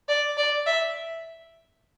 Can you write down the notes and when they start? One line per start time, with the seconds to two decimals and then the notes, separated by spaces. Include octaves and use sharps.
0.08 D5
0.37 D5
0.66 E5